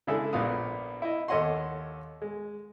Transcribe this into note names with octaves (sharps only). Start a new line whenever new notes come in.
C#3 G#3 D4 E4 G#4 A4
A#1 A#2 B3 F5 D#6
E4 D#5
D#2 A4 C#5 D#5 F#5 C6
G#3